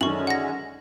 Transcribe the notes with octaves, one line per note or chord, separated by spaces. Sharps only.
F#2 D3 D#3 G#3 C#4 C#6 F#7
F#5 A#6